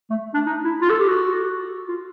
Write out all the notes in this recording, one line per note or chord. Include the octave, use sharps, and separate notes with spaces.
A3
D4
D#4
E4
F4
A4
G4
F#4
F4